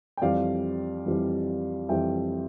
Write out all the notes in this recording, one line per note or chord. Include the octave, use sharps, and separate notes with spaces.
G5
F2 E3 G3 D5 F5
F2 E3 G3
F2 E3 G3 E5 G5